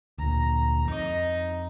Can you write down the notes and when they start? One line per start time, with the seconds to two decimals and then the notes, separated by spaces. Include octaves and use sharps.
0.18 D2 A#2 A#5
0.87 F2 D#4 D#5